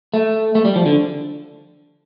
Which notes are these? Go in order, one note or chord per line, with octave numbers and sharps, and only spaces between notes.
A3
A3
G3
F3
D3